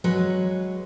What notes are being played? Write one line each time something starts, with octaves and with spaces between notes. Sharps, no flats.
F#3 G#3 B4 C#5